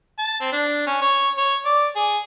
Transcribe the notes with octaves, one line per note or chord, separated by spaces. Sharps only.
A5
C4
D4
C#4
C#5
C#5
D5
G#4